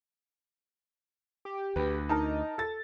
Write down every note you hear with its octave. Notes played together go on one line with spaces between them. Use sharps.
G4
D2 B4
D#4 A#4 A5
A4 A6